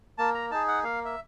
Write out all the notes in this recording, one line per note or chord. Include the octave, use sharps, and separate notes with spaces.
A#3 A5
A#5
D#4 G#4 A5
F#5
A#3 F5
E5